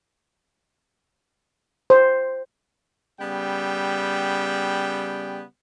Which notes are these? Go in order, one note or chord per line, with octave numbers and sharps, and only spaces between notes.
C5
C#3 G3 B3 G5